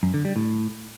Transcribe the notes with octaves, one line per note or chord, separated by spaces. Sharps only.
F#2
D3
G3
A2